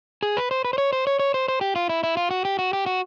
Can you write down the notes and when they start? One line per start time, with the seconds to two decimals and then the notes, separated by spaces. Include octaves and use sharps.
0.23 G#4
0.37 B4
0.51 C5
0.65 B4
0.73 C5
0.78 C#5
0.93 C5
1.07 C#5
1.19 C#5
1.34 C5
1.48 C5
1.61 G4
1.76 F4
1.89 E4
2.03 E4
2.17 F4
2.31 F#4
2.45 G4
2.59 F#4
2.73 G4
2.86 F#4